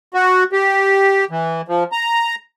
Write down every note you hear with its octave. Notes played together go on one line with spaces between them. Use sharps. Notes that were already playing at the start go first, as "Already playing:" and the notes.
F#4
G4
E3
F3
A#5